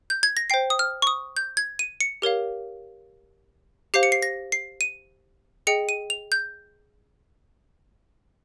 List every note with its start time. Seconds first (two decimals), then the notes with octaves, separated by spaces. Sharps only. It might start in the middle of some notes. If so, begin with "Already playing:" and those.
0.10 G6
0.23 G#6
0.37 A#6
0.50 C5 G5 C7
0.70 D#6
0.79 F6
1.02 C#6
1.07 D#6
1.37 G6
1.57 G#6
1.79 D#7
2.01 C#7
2.22 G4 A#4 C#5 F5
3.94 G4 C5 F5 C7
4.03 C#7
4.12 C7
4.22 A#6
4.52 C7
4.81 D#7
5.67 G#4 D#5 G5 C#7
5.89 D#7
6.10 F7
6.32 G6